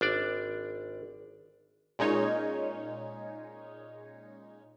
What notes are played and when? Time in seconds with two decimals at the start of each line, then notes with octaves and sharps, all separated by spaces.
0.01 G#1 D4 D5
1.99 A#2 G#3 C#4 D#4 C#5 G#6